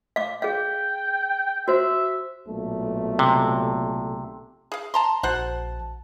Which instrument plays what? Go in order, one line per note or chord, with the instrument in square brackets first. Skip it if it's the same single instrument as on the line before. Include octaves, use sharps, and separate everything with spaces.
[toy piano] F5 D6
[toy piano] G#4 F5 [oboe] G5
[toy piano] F#4 C5 [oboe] E5
[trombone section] B1 A#2 A3
[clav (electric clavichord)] C3
[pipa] G#4 F5
A5 A#5 C6
[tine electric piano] A#1 A5 [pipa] F#4 C5 F#5